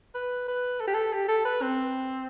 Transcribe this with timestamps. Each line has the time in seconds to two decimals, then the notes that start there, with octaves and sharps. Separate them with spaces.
0.15 B4
0.48 B4
0.80 A4
0.87 G4
0.94 A4
1.13 G4
1.28 A4
1.45 B4
1.62 C4